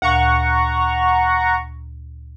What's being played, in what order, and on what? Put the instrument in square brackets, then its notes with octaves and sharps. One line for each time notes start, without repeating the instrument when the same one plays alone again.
[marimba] D2 A#2 F5 [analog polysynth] F#5 A#5 C#6